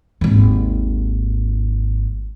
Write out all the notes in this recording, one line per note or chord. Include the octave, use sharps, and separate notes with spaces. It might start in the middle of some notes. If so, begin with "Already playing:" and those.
G#1 D#2